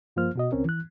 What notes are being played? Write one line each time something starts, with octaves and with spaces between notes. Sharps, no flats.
G2 F3 A#3 F4 C5 F6
B2 F#4 D#5
C#2 C4 C#4 A#4
E3 F#6